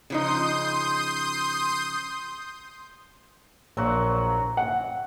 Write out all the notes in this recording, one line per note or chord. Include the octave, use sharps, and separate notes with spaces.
C#3 F3 D#4 C6 D#6 G6
A#1 A#2 F#3 F#4
F#5